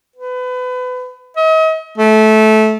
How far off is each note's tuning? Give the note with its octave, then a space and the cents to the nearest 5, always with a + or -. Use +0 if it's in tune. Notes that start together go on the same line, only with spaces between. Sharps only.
B4 +30
D#5 +40
A3 -20